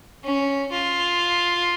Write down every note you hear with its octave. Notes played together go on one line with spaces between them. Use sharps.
C#4
F4